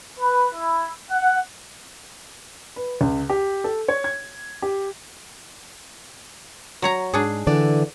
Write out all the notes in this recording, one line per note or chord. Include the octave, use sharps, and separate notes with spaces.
B4
E4
F#5
B4
C#2
G4
A4
C#5
G#6
G4
F#3 C#5 A#5
G#2 D4 G#4
D3 E3 D5